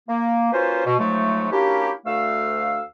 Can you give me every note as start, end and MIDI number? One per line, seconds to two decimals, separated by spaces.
0.08 0.51 58
0.53 0.84 58
0.53 0.84 61
0.53 0.84 65
0.53 0.84 66
0.53 0.84 71
0.53 0.84 72
0.85 0.96 47
0.99 1.47 44
0.99 1.47 53
0.99 1.47 54
0.99 1.47 56
0.99 1.47 57
1.52 1.91 58
1.52 1.91 61
1.52 1.91 62
1.52 1.91 64
1.52 1.91 66
1.52 1.91 67
2.06 2.82 38
2.06 2.82 57
2.06 2.82 77
2.06 2.82 88